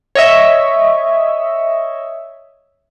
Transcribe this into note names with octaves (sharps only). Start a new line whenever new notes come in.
C#5 D#5 E5